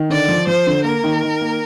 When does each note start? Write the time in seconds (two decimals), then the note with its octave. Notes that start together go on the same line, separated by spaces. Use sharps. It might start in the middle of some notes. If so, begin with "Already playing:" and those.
Already playing: D#3
0.10 D3 D5
0.28 F3
0.47 F3 C5
0.67 D3
0.84 A#3 A#4
1.04 D#3
1.23 D#3
1.41 A#3